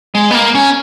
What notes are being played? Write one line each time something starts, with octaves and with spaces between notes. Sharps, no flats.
G#3
B3
A#3
C#4